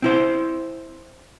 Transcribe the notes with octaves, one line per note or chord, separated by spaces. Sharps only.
C4 E4 C5